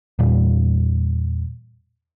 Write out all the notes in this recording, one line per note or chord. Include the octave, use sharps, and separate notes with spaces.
E2 A#2 G3